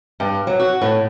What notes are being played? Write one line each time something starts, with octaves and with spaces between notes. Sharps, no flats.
G2
F#3
F#4
A2